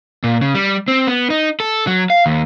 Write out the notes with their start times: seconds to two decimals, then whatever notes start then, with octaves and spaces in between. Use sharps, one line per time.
0.24 A#2
0.41 C#3
0.55 G3
0.88 C4
1.07 B3
1.30 D#4
1.60 A4
1.87 F#3
2.10 F5
2.26 D#2